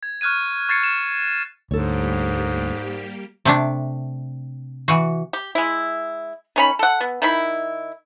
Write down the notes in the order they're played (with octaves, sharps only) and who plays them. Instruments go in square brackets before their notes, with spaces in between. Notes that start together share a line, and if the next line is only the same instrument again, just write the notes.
[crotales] G#6
C#6 F6 F#6 G#6 D#7
C#6 G#6 A6 C7 C#7
E7
[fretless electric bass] D2 [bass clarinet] G#2 [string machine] G3 A#3 G4 [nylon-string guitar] A4 C#5
[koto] C3 A3 D4
E3 F#4
[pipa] G4
G#3 E4
D#3 C#4 B5
A4 F#5
B3
D#3 E4 B5